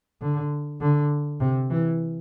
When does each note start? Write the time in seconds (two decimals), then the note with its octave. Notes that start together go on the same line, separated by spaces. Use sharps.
0.21 D3
0.81 D3
1.41 C3
1.70 E3